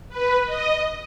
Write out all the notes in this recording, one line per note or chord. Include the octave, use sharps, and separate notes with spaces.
B4
D#5